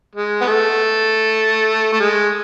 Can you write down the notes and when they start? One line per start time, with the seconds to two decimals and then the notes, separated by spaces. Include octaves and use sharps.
0.15 G#3
0.41 B3
0.46 A3
1.93 A3
2.00 G#3